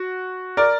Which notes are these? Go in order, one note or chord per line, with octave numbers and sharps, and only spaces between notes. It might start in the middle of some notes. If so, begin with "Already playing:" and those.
Already playing: F#4
A#4 D5